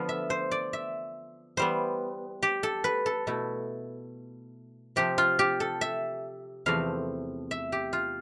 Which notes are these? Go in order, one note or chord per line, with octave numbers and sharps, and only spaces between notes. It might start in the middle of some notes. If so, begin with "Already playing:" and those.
Already playing: D3 F3 B3 F4
E5
C5
D5
E5
E3 G3 B3 C5
G4
A4
B4
A4
B2 A3 E4
C3 F3 C4 G4
F4
G4
A4
E5
E2 C3 F3 A3 C4 F5
E5
G4
F4